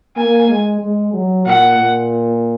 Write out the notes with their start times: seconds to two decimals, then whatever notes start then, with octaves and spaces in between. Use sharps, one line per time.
0.16 A#3 G#5
0.49 G#3
0.81 G#3
1.13 F#3
1.46 A#2 F#5
1.78 A#2